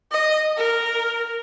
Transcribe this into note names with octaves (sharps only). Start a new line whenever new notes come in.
D#5
A#4